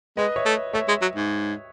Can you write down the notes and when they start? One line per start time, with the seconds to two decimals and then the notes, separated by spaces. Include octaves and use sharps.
0.17 G#3 B4 D#5
0.36 C#5 E5
0.45 A3
0.73 A3 C#5 E5
0.88 G#3
1.02 F#3
1.16 G#2